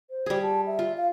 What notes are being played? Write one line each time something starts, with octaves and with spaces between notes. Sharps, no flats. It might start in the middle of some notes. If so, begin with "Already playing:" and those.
C5
G3 G#4
A5
E5
F4
F5